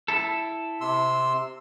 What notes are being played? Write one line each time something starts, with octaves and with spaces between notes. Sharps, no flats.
E4 A4
C3 C6 E6